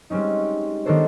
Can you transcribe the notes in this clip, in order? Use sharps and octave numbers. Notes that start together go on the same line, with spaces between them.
G3 G#3 C4 C#4 D#4
D#3 B3 D4 A4 C5 C#5